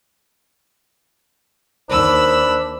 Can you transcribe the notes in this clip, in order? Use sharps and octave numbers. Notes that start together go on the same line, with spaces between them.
D#2 D4 C5 B5 E6